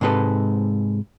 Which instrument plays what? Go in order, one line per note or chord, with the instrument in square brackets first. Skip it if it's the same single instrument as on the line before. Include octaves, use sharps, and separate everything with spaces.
[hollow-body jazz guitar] G#2 C3 G#3 A4 B4